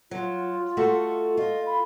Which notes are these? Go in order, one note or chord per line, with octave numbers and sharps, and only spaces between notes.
F#3 F4
A3 F#4 A4
F4 D#5
B5